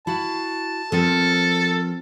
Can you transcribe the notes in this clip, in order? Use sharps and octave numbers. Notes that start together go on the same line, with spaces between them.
E4 F#4 F5 A5
F3 C4 A4 A#4